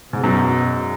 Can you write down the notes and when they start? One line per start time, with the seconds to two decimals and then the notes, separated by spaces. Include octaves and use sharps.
0.13 G#2 B2
0.24 F#2